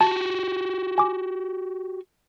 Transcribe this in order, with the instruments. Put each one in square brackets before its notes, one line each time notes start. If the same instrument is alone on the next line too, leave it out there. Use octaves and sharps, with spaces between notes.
[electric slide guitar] F#4 G4 [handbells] A5
[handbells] G#5 D6